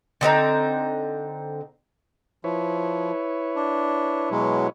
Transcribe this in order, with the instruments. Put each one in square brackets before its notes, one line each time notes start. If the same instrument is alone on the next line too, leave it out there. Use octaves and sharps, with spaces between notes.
[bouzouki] D3 C4 D#4 A#5
[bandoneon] F3 [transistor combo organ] E4 B4 C#5
[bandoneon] D4
B2 F#3 G#3